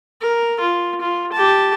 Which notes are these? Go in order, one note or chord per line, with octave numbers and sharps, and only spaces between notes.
A#4
F4
F4
G4 A5